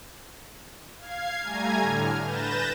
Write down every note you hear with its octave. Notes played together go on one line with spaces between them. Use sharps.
F5 G#6 C7
G3 A3 G#5 A#5 G#6
A2 D3 F6
B4 G6 A6 A#6 E7